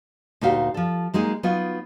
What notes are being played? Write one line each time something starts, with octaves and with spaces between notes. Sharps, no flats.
D2 A#2 D#4 F#4 G4 F5
F3 A4
F#3 G#3 A#3 D#4 G#4
F#3 B3 D#4 F4